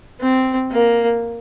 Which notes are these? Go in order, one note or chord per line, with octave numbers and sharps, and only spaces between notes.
C4
A#3